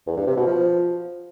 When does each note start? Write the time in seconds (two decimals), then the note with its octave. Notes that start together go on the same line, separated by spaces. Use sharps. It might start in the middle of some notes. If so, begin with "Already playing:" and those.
0.06 E2
0.17 G2
0.27 C3
0.37 B2
0.47 F3